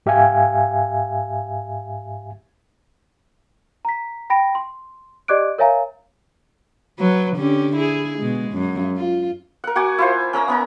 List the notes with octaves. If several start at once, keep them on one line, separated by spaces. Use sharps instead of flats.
G#2 G4 E5 F5 G#5
A#5 B6
G5 B5 A#6 D7
C6
G4 D5 D#5 D6 F#6 D7
A#4 C#5 E5 F5 G#5 A#5
F#3 B4
D3 C#4 G4
E4 G#4
B2 G#3
F#2
F4
A#4 F#5
F#4 F#5 G#5 D6
E4 F4 C5
C#4 A#4 E5 A#5
B3 C#4 A#5